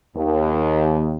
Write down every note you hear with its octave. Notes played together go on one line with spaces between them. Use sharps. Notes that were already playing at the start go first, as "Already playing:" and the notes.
D#2